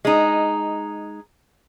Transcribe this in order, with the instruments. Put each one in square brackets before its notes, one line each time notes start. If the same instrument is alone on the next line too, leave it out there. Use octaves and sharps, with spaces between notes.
[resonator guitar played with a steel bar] G#3 D#4